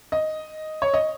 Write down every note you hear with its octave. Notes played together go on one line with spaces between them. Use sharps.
D#5
C#5
D#5